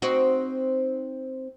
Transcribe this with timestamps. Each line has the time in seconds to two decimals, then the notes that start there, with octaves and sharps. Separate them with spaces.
0.02 C4 D#4 F#4